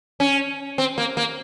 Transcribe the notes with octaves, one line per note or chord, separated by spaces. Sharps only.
C#4
C4
A#3
A#3